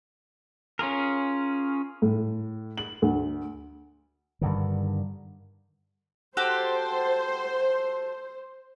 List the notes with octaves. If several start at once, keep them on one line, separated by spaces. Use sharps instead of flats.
C#4 F4 G#4 A#4
A2
F#7
D2
G2 D3 D#3
F#4 G4 A4 C5